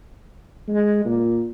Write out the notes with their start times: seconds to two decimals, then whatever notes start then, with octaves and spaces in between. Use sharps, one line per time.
0.68 G#3
1.05 A#2